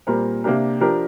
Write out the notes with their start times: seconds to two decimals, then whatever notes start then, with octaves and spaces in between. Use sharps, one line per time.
0.07 A#2 G3 C4 A#4
0.44 C3 A#3 D4 G4 A#4
0.81 F3 D4 G4 A#4